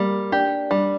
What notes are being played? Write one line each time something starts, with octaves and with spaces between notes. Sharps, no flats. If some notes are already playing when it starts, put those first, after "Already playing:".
Already playing: G3 A#3
D4 G4
G3 D4